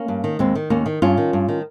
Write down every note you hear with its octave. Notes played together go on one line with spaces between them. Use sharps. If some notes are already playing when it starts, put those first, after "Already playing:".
Already playing: A#3 C#4
G2
D#3
D#2 G#3 C4
D#3
D#2 A#3 C#4
D#3
G2 C#4 F4
D#3
G2
D#3